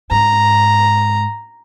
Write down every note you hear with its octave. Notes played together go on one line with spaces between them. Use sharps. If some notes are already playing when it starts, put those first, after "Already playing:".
G#2 A#5